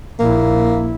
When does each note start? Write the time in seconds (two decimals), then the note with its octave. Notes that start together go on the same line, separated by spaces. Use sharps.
0.19 A#1 A#3 E4